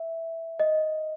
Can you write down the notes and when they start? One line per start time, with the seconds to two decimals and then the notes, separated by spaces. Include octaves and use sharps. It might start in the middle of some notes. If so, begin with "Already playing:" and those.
Already playing: E5
0.60 D#5